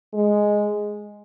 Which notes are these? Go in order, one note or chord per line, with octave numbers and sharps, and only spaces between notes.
G#3